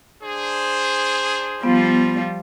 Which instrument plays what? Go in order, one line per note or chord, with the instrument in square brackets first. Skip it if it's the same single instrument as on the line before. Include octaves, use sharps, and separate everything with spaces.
[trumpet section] D4 G#4 [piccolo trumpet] C5
[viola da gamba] F3 G3 F4 [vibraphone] B3